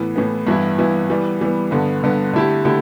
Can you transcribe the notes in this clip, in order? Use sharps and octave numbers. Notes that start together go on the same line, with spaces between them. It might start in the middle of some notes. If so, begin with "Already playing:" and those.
Already playing: A2 E3 B3
A2 E3 B3
G2 E3 B3 E4
G2 E3 B3 E4
E3 G3 B3
E3 G3 B3
G2 D3 B3
G2 D3 B3
D3 A3 E4 G4
D3 A3 E4 G4